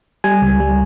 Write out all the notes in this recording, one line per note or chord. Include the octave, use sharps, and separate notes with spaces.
G3 G#5
C#2
G3